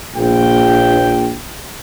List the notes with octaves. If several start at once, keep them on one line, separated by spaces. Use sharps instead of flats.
A#1 G5